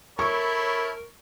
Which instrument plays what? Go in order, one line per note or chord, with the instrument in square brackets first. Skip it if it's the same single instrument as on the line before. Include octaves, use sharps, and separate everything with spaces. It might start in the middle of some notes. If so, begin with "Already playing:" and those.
[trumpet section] E4 A4 C#5 [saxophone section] A#4 [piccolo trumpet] B5 [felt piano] C#6